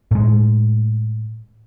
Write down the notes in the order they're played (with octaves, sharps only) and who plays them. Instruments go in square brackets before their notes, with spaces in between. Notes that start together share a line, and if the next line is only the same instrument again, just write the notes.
[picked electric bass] A2 G#3